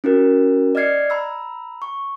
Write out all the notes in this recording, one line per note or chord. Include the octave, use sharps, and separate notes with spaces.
C#4 E4 F#4 A#4
D5 D#5 F6 G#6 C7 C#7
A#5 B5 E6
C#6